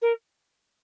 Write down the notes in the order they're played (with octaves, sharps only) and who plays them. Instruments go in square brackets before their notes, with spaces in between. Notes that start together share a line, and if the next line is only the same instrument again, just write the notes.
[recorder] A#4